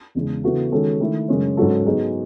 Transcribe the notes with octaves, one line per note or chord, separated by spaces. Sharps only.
E2 C#3 G#3
C#3 E3 B3 F#4 A4
D#3 G#3 C#4 F#4 A4
D#3 A3 E4 A4
F#2 C#3 G#3 C#4
G#2 F#3 C#4 F#4 A4
F#3 B3 D#4 G#4